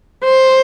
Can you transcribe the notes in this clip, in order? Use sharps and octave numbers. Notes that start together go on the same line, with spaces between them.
C5